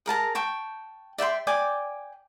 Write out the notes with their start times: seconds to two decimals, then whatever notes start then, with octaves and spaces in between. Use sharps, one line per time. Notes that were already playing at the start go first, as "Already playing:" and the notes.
0.06 G#4 A#4 A5 A#5
0.35 G5 A5 C#6
1.18 D5 E5 G5 C6
1.47 D5 G5 G#5 D6